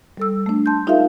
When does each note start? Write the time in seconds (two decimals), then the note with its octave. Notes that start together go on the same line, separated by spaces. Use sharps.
0.17 G3 A4 E6
0.46 A3 D4
0.66 A5 C6 G6
0.87 D#4 F4 G#4 A#4 E5 F5